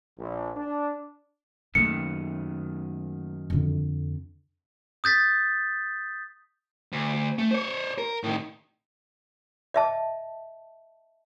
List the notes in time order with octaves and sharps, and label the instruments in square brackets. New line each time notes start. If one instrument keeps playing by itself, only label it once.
[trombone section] A#1
D4
[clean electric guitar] F#2 D#3 [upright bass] A3 A#3 [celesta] C#7
[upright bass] F2 D3
[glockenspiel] D#6 G6 A6 B6
[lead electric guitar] D2
A3
C5 C#5
A#4
A2 D#3
[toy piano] D#5 E5 A5